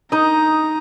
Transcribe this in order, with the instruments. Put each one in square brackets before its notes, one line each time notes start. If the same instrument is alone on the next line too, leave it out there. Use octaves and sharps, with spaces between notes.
[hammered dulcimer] D#4 D#5 [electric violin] A#5